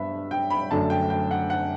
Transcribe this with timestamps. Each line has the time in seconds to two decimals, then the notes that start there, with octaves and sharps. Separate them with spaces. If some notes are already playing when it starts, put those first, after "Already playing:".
Already playing: G2 B3 D4 E5 B5
0.31 G5
0.50 B5
0.71 F#2 D3 A3 D4 A5
0.90 G5
1.10 G5
1.31 F#5
1.50 F#5